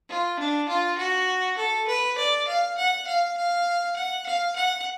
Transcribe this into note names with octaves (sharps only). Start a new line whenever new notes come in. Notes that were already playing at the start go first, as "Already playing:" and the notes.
F4
D4
F4
F#4
A4
B4
D5
F5
F#5
F5
F5
F#5
F5
F#5